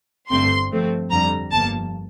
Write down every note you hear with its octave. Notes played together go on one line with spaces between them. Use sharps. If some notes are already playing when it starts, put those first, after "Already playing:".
G1 G2 D3 A3 C4 C6
G2 F3 A3 C4
F2 D3 G3 A#5
G1 G2 F3 A#3 A5